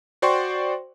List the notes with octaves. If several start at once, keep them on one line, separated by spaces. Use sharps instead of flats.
F#4 C5 D5 G5 C6 C#6